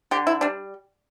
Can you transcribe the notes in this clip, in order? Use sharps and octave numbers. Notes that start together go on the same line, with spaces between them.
D3 G4
E4
G3 D4